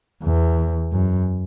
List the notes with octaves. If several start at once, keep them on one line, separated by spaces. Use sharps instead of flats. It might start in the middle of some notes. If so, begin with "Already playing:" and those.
E2
F#2